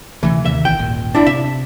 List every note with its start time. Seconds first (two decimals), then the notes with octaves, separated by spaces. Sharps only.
0.23 D2 C3 E3 A3
0.45 D#2 C3 D#3 E5
0.65 A#1 D#3 E3 G5
0.78 D#1 G#1 A#2
1.15 D4 E4
1.26 C3 E5